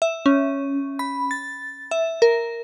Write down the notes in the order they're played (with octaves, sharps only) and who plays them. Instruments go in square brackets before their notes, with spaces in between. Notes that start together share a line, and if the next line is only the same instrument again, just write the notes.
[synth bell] E5
C#4
B5
A6
E5
A#4